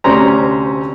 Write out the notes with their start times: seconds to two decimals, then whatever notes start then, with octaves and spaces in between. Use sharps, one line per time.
0.04 D2 C3 C#4 C5 A#5